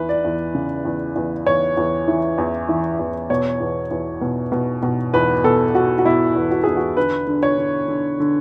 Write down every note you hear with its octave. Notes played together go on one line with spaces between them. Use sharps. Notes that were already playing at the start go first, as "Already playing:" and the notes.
Already playing: E2 E3 B4
D5
E2
C#3
E2
E2
E2 C#5
E2
E3
E2
E3
E2
B2 C#5
E2
E2
B2
B2
B2
E2 B4
B2 A4
B2 F#4
F#4
B2 E4
E2
F#4
E2 G#4
F#4
D3 B4
D3
C#5
D3
D3
D3